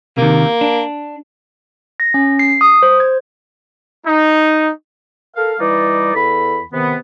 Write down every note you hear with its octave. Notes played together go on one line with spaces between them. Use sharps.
C3 D#3 A#3
D4
A#6
C#4
C7
D#6
C5
G#6
D#4
A4 A#4 F5
E3 G3 D#4 D5
E2 A4 B5
C3 D#3 B3